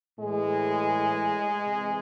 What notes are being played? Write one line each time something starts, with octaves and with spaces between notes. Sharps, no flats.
A2 E3 G#3
C3 E3